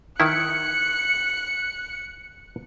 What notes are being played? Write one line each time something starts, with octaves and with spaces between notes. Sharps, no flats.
D#3 E4 F#6 C#7